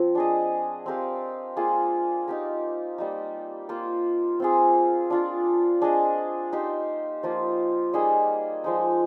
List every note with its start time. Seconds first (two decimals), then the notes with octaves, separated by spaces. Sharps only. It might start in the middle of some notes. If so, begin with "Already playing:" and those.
Already playing: F3 C4
0.15 D4 G#4 D#5
0.86 C4 G4 A#4 F5
1.57 A#3 F4 G#4
2.28 D#4 G4 A#4
2.98 G3 A#3 D#4
3.69 A#3 F4 C5
4.40 C4 F4 G#4
5.10 D4 F4 A#4
5.82 D4 G#4 D#5
6.53 D#4 G4 C5
7.23 F3 A#3 F4
7.93 G3 A#3 D#4 G#4
8.64 F3 G#3 D#4